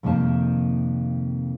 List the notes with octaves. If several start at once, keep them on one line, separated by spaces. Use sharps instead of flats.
F2 C3 D#3 A#3 A5